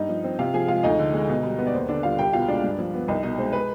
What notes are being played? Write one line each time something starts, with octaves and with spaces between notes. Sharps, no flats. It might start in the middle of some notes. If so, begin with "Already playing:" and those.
Already playing: G2 D#4 D#5
F3
C4
C3 F4 F5
F3 G#4 G#5
G#3 F4 F5
D2 D#4 D#5
D3
G#3
B2
G3
B3
D5
D#2 C5
D3 D4 D5
G3 F4 F5
C2 G4 G5
B2 F4 F5
G#3 D4 D5
G2
F3
B3
C2 D#4 D#5
B2 D#4 D#5
G#3 C5
B4